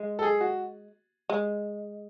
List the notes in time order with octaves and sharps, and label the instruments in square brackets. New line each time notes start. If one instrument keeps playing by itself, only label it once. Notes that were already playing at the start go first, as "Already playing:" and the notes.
Already playing: [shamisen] G#3
[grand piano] A4
G#4
F#4
[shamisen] G#3